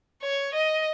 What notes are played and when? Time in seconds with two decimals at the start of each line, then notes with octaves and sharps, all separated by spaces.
0.23 C#5
0.54 D#5